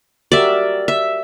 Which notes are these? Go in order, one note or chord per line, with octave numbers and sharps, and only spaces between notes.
F#4 G4 A#4 D5 E5
E5